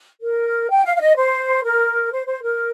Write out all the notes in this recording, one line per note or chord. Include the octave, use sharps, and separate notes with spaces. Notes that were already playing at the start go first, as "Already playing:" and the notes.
A#4
G5
F5
F5
D#5
C5
A#4
C5
C5
A#4